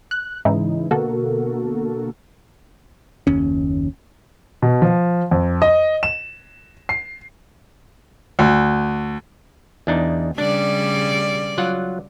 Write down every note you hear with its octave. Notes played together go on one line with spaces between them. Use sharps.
F#6
G#2 C#3 E3 G#3 D#4 E4
B2 D3 A#3 F#4 A4 A#4
F#1 D#2 C#4
B2
F3
F2
D#5
E7
C7
D2
E2 D4 D#4
C#3 G3 D4 D5
F#3 F4 F#5